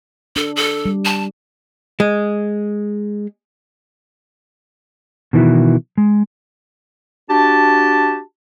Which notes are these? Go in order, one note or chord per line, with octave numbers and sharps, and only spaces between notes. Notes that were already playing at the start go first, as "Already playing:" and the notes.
D4 A4
A4
G3
A5
G#3
B2 D#3 E3 A3 E4 F#4
G#3
D4 F#4 G4 A5